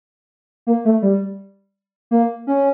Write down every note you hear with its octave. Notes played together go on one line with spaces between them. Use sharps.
A#3
A3
G3
A#3
C#4